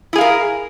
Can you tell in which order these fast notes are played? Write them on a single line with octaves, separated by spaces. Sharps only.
E4 G#4 F5 A#4